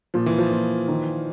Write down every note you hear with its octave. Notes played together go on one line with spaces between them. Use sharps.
A#2 F3
E3
F3
A#2
D#3